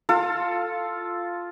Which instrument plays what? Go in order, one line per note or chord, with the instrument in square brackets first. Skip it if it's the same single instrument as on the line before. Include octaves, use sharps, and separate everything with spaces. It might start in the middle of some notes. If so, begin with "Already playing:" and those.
[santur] F4 A4